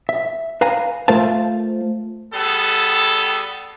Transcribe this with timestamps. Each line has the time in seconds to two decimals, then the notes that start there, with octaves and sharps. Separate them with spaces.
0.09 E5
0.61 B4 F5 G#5 A#5
1.08 A3 F4 A#4 C5 F5 A5
2.34 G3 B3 G#4 A4